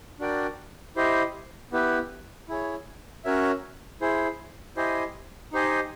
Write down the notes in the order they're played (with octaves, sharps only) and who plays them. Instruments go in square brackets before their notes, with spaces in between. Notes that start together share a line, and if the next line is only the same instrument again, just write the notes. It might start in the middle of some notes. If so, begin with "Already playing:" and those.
[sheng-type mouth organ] D4 F#4 A#4 D5 G5
E4 G4 C5 D#5
B3 E4 G4 B4
E4 G#4 C#5
C#4 F#4 A#4 C#5 E5
E4 G#4 C5
E4 G4 C5 D#5 G#5
D#4 G4 C5 D#5 G#5